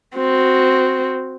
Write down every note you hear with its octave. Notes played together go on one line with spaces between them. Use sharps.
C4 F#4